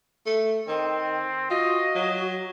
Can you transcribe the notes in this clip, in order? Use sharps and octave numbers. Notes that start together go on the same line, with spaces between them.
A3
D#3 C4
F4 F#4 D#5
F#3